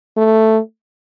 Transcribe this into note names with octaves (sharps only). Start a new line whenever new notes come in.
A3